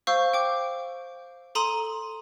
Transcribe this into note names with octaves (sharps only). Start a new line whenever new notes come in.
C5 F5 C#6 E6 G6
G5 D6
A4 A#5 C6 D#6 D#7 F#7